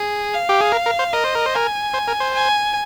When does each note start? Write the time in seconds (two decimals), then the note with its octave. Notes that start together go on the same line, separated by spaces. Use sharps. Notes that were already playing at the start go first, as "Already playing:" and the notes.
Already playing: G#4
0.33 F5
0.49 G4
0.61 G#4
0.72 A#4
0.86 A#4
0.99 C5
1.13 A#4 D#5
1.24 C5
1.35 A#4
1.46 C5
1.54 A#4 G#5
1.94 C5
2.08 A#4
2.20 C5
2.33 G#5